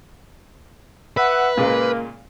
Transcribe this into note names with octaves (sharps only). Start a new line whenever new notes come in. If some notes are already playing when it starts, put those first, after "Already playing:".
B4 E5 F#5
A#2 C#3 G#3 A#3